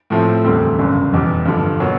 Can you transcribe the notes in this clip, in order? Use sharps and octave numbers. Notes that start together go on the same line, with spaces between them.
A2 F3 A3 C4
E1 D2 D3 G3 C4
G1 F#2 C#3
F1 E2 B2 G3
G2 D3 F3
B2 F#3 A#3